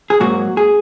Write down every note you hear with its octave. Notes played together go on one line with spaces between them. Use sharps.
G#4
G#2 F#3 A#3 F#4
G#4